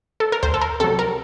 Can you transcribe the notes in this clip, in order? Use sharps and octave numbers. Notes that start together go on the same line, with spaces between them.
A4
A#4
D2 C5
A4
A#4
C3 F#3 A4
A#4